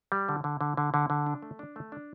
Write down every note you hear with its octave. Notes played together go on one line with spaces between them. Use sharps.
G3
D3
D3
D3
D3
D3
D3
D4
A3
D4
A3
D4